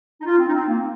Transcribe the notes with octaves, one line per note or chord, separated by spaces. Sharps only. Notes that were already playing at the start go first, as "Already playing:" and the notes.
D#4
F4
C4
D#4
C4
A#3